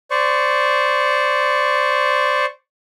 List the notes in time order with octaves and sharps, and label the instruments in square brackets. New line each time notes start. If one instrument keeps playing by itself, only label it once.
[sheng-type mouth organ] C5 D5 C#6